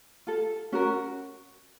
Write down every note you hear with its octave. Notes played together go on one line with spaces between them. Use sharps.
F4 A4
C#4 F#4 A#4